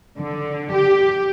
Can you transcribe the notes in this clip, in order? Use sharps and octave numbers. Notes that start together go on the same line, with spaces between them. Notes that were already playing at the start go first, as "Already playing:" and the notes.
D3
G4